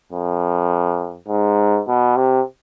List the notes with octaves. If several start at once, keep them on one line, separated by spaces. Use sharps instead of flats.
F2
G#2
B2
C3